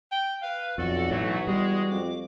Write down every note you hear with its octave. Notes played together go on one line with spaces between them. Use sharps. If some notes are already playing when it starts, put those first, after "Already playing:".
G5
B4 F5
B1 F2 F#4 A4 D5
A2 E3 F#3 A3
E2 G3 G#3 G#4
F2 D6